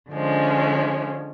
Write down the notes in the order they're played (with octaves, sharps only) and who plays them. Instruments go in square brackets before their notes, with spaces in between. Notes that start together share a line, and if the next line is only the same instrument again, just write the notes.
[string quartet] D3 F3 G#3 C#4